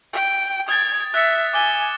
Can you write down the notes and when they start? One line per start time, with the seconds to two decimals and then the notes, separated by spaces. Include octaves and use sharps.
0.13 G5
0.68 D#6 G#6 A6
1.14 E5 F#6 A6 C#7
1.53 G#5 D6 G7